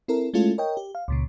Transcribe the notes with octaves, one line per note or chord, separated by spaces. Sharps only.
C4 E4 A4 A#4
G#3 A3 C#4 E4 F4 A4
A#4 C#5 D#5 G5
G4
F5
C#2 A#2 C#3